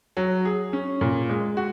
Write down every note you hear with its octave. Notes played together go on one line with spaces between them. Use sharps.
F#3
G#4
C#4
A#2
G#3
F#4